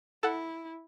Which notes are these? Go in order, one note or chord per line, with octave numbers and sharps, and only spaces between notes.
E4 A4 F#5